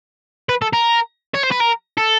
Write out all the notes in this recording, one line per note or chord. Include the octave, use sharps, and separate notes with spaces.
B4
A4
A#4
C#5
C5
B4
A#4
A4